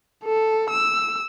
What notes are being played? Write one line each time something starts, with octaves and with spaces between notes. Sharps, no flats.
A4
E6